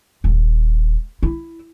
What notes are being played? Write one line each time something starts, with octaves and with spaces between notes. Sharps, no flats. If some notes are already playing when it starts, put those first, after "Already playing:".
D#1
E4